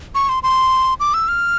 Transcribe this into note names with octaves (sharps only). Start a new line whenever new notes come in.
C#6
C6
C6
D6
E6
F6